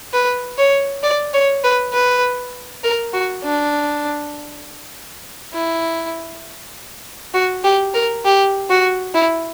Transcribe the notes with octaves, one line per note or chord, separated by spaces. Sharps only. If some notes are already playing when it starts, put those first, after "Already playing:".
B4
C#5
D5
C#5
B4
B4
A#4
F#4
D4
E4
F#4
G4
A#4
G4
F#4
E4